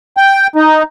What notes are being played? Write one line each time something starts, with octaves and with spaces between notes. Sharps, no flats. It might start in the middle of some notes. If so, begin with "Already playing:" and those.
G5
D#4